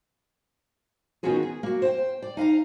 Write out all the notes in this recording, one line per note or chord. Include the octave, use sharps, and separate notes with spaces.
D#3 B3 C#4 F4 F#4 G#4
G#4
A#3 F#4
C5 G5
D5
D#4 F5 F#5 A#5